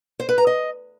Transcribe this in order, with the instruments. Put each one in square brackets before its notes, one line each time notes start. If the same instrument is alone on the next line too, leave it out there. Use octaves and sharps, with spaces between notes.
[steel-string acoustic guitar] C5
B4
A#5
D#5